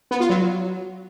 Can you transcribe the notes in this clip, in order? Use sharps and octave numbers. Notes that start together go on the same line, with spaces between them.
B3
F4
F#3